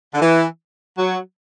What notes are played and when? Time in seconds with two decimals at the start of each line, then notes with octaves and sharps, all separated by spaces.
0.14 D3
0.22 E3
0.98 F#3